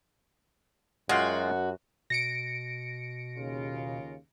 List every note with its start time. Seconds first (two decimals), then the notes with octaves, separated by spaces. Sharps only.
1.09 F#2 G#3 F4 F#4 G5
2.10 B2 A#6 C#7 D7
3.37 D#2 C#3 F4